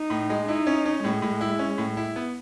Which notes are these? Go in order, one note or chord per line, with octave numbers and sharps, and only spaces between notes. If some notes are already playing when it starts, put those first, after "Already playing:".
Already playing: D#4
A2
G#3
D#4 E4
C#4
C#4
A2 G#3
A2
E4
C#4
A2
E4
B3